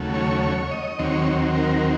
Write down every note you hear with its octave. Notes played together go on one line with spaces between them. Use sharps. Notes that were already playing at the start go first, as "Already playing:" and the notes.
Already playing: D#2 C#3 F#3 A3
C#5
C#5
D#5
D#2 D#3 F#3 C4 C#5
A#4